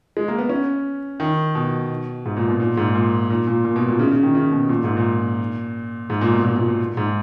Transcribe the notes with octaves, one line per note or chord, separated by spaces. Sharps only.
G#3
A#3
B3
C#4
D#3
B2
G#2
A#2
B2
A#2
G#2
A#2
A#2
A#2
A#2
B2
A#2
C#3
C#3
D#3
C#3
B2
A#2
G#2
A#2
G#2
A#2
B2
A#2
A#2
A#2
G#2